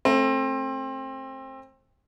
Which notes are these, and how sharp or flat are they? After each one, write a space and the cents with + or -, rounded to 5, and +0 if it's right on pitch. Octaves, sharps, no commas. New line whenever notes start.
A3 +0 C4 +25